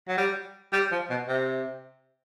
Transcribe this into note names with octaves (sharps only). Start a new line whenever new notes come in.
F#3
G3
G3
F3
B2
C3